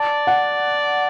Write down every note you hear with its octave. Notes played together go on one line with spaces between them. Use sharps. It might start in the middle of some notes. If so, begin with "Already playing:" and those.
Already playing: D5 A5
F#5